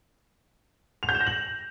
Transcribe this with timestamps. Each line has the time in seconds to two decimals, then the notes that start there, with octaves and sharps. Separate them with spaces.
1.03 F7
1.09 G6
1.15 E7
1.21 A#6
1.27 F#7